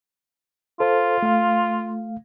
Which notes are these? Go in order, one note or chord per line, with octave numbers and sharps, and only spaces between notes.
F4 A4 C5
A3 F5